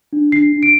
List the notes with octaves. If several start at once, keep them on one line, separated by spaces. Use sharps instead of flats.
D4
D4 C7
D4
D7